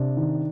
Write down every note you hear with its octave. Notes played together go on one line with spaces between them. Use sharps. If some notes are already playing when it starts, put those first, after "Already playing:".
Already playing: C3 D4
D#3